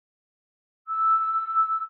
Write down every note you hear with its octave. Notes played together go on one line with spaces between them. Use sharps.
E6